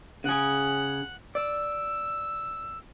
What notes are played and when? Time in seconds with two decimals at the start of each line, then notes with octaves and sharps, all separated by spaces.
0.24 C#3 G#4 F#5
1.35 D5 E6